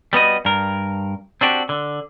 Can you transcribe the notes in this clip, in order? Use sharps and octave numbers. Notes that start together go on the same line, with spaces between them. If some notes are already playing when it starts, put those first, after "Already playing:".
G3 B3 F#4 D#5
G2 A#4
C4 D4 F#4 G4
D3